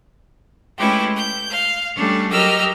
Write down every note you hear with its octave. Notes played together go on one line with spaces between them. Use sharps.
G#3 A3 C#4 E4 G4 B4
G6
F5
G3 A3 C#4 D4
F#3 G4 A#4 D#5 E6 F6